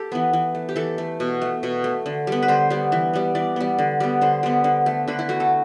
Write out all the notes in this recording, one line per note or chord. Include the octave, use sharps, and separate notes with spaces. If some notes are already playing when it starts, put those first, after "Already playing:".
Already playing: G4 A4
E3 B3
E3
A3
G4
E3 A4
A3
B2
A3
B2
A3
D3
G3 B3
B4
D3 C5
G3 B3
E3
G3 B3
E3 D5
G3 B3
D3
G3 B3
D3 C5
G3 B3
D3
A3
D3 B4
E4
A3 F#4
A4